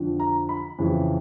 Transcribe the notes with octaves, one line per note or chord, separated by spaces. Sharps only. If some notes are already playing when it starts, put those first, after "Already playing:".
Already playing: F2 D3 F3
A#5
B5
F2 C#3 E3